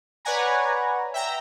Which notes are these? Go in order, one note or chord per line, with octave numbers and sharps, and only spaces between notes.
B4 C#5 D5 F#5 G#5 A#5
E5 G5 A#5